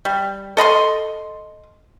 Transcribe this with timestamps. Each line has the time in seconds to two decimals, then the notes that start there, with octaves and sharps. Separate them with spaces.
0.05 G3
0.57 A4 D#5 B5 C6